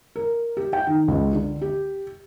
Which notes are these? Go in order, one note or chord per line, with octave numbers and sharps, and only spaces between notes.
A#4
G4
G5
D#3
C#2
D3
G4